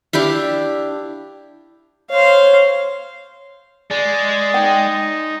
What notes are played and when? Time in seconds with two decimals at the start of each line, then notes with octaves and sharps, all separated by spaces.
0.13 D4 E4 G4 F5
2.10 C5 C#5 F5
3.91 G#3 D5
4.54 D#4 G5